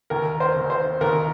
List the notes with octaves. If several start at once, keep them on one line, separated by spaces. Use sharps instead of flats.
D#2 A#4
C5
D#2
C5
D#2 A#4